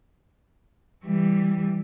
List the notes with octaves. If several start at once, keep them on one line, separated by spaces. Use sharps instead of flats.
E3 G3